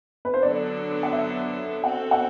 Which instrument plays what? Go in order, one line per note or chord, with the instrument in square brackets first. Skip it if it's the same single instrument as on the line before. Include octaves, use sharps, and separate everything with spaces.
[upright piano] B4
C5
[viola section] D3 F#3 B3 D4 A4 [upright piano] D5
[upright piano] F#5
E5
[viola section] C4 F#4 A4 [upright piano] F#5
[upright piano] F#5